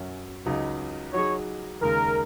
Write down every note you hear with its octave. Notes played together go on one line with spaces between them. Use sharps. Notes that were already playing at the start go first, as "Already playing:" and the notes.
Already playing: F#2 F#3 C#4
C#2 C#3 F#3 D#4
F#3 D#4 G#4 C#5
D#2 C#3 G#3 D#4 A#4